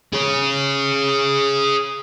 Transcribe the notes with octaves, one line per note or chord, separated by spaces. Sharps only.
G#4 C#5